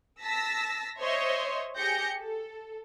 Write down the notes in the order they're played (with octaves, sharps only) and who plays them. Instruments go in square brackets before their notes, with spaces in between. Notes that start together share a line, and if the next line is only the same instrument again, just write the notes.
[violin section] A5 E6 A#6 B6
C5 C#5 D#5 E5 C6
G4 G#4 G6 A#6 C#7
A4